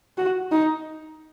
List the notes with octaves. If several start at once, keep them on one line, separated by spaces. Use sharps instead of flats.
F#4
D#4